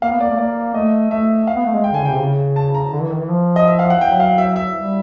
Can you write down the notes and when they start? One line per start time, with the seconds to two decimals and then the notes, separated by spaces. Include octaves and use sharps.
0.02 A#3 F5
0.11 B3
0.20 A#3 D5
0.30 A3
0.38 A#3 D5
0.74 A3 D#5
1.11 A3 E5
1.47 F5
1.56 B3
1.65 A3
1.75 G#3
1.84 G5
1.92 D3 G#5
2.02 C#3
2.05 G5
2.11 C3
2.20 C#3
2.56 A5
2.75 A#5
2.92 D3
3.01 E3
3.11 D#3
3.19 E3
3.29 F3
3.56 D#5
3.68 E5
3.79 F5
3.90 F#5
4.01 F#3 G5
4.20 F5
4.38 E5
4.56 E5
4.74 G3